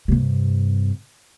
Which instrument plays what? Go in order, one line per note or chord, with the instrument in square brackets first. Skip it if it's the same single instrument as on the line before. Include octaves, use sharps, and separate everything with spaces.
[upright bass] G2 C3